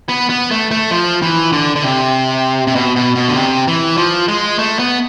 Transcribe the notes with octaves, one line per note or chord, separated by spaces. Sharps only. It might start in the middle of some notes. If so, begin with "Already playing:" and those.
B3
B3
A3
A3
F3
E3
D3
D3
C3
C3
B2
B2
B2
D3
C3
E3
F3
G#3
A3
B3